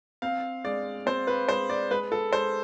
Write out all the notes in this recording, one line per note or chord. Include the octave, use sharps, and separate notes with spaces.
C4 F5
G#3 D5
C4 C5
B4
G#3 C5
D5
G#3 B4
A4
G#3 C5